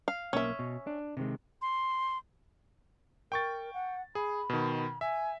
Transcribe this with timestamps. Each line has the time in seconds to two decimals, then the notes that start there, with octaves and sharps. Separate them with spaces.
0.08 F5
0.33 B1 A#3 C#4 E5
0.59 B2
0.87 D4
1.17 C3 D#3 G#3
1.62 C6
3.32 A#4 G5 C#6 A6
3.73 F#5
4.15 G#4 B5
4.50 B2 D#3
5.01 E5 G#5